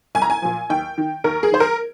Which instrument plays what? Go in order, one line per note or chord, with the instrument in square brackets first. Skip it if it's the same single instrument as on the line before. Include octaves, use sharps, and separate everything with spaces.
[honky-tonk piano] C2 G#5
A#5
G#5
A#2 F3
D#2 G5
D#3
D#2 A#4
G#4
D#3 C5
A#4